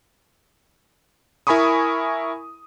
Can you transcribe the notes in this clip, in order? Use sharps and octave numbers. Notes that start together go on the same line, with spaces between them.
E4 A#4 G#5 B5 C#6 D#6